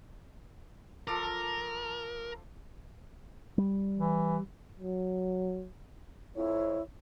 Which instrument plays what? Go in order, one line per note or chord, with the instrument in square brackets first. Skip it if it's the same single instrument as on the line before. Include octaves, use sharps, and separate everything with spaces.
[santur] F3 A4 D6 [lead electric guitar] A#4
[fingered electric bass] G3
[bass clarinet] E3
[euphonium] F#3
[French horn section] F2 C#5 [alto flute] E4